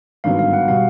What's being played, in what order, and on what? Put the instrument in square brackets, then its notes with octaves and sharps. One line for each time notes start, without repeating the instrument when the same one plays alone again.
[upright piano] G#1 G2 D3 F#3 B3 [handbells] F5
[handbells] F5
F#5
[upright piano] B2 G3 [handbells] F5